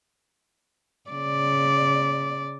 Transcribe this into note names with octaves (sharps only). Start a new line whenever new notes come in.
C#3 D5